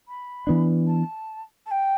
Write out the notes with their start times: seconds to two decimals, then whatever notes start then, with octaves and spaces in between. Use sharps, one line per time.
0.08 B5
0.47 E3 B3 D4
0.87 A5
1.66 A5
1.71 G5